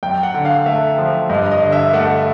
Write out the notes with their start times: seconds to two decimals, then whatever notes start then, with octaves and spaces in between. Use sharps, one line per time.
0.03 F#2 G5
0.23 F#5
0.34 D3
0.45 F5
0.66 A3 E5
0.98 F3
1.30 G2 D#5
1.51 D#5
1.62 D3
1.72 E5
1.93 A3 F#5